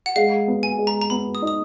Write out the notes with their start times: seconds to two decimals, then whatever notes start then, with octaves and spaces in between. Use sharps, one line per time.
0.06 F#5
0.16 G#3 F5
0.48 B3
0.63 G#5
0.78 G#3
0.87 A#5
1.01 A#5
1.10 B3 B5
1.35 D#6
1.42 D#4
1.47 D#6